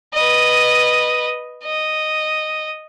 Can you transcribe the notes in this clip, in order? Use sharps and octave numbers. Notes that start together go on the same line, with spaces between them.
B4 D#5
D#5